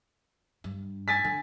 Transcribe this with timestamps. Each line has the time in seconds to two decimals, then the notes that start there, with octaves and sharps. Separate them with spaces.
0.64 G2
1.08 G#5 A6 B6
1.24 D3